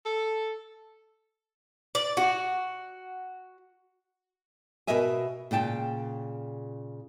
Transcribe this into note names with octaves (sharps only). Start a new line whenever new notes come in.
A4
D5
F#4
B2 F#4 A#4 D#5 E5 G#5
A#2 C#3 G5 A5